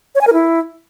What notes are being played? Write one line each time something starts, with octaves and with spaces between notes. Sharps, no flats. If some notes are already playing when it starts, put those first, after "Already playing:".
C#5
G#5
A#4
E4